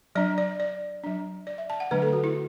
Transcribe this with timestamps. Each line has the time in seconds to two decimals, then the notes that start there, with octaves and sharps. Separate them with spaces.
0.15 F#3 D4 D5
0.38 D5
0.60 D5
1.04 F#3 D4
1.47 D5
1.58 E5
1.70 A5
1.80 F#5
1.91 D3 F#3 A3 D4 B4
2.02 A4
2.13 F#4
2.24 E4